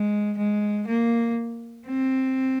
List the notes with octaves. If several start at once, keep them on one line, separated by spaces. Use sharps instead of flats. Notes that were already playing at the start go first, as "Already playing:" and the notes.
Already playing: G#3
G#3
A#3
C4